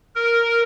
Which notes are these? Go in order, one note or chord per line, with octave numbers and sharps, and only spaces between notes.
A#4